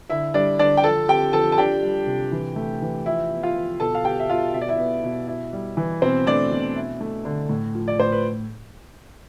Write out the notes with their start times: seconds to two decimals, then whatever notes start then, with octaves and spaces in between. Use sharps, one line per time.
0.09 D3 E4 E5
0.34 G3 D4 D5
0.59 D3 D4 D5
0.77 G5
0.83 F3 A4 A5
1.09 C4 G4 G5
1.33 F3 A4 A5
1.52 A5
1.58 D4 G4 G5
1.82 G3
2.07 C3
2.32 E3
2.56 A3
2.82 E3
3.06 F3 E4 E5
3.31 B3
3.43 F4 F5
3.56 F3
3.80 B2 A4 A5
3.95 F5
4.05 B3 G4 G5
4.20 E5
4.29 B2 F4 F5
4.54 B2 E5
4.61 D5
4.69 E4 E5
4.78 B3
5.04 B2
5.27 E4
5.53 G3
5.77 E3
6.02 B2 C4 C5
6.27 A3 D4 D5
6.51 B2
6.76 E4
7.01 A3
7.25 D3
7.49 A2
7.75 F3
7.88 D5
8.00 A2 C5
8.12 B4